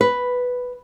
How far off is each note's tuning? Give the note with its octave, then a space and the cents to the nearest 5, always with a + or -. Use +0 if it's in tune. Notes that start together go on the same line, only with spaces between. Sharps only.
B4 +0